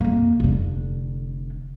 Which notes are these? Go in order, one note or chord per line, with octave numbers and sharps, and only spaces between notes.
F2 A#3
F1 D3